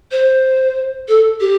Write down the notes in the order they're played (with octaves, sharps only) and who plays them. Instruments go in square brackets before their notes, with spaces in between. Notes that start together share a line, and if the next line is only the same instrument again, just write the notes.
[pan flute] C5
A4
G4